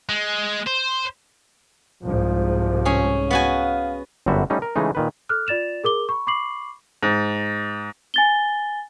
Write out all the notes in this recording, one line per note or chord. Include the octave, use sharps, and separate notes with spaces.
G#3
C5
C2 G#2 F3
C#4 G#4
B3 F#4 F5 G#5
G1 F#2 D3 G3 F#4 E5
G3 A3 C#4 D#4
A#4
C#3 E3 G#3 A3 D#4
A#2 D#3 B4
A4 D6 F6 F#6
F4 D5 A6 E7 F7
G#4 A#4 D6 G7
B5 C#6
B5 C#6 D6 C7 F#7
G#2
G#5 A6 G7